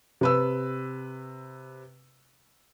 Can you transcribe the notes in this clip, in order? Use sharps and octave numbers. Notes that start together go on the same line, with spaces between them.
C3 B4 E6